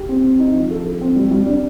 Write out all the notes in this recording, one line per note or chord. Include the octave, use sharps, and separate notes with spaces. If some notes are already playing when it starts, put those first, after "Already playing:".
Already playing: G4
C4
C4
D#4
F3
A4
A4
C4
G3
G3
D4